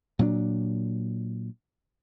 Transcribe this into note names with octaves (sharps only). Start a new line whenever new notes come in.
A#2 F#3 C#4 D4